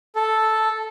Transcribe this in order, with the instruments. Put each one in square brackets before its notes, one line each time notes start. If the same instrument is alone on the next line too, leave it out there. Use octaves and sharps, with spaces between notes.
[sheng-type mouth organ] A4